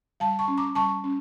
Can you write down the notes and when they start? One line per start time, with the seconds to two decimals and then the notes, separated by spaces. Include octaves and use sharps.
0.20 G3 F5 A5
0.39 A5 C#6
0.48 C#4
0.57 A#5 D6
0.75 G3 A5 C#6
1.04 C#4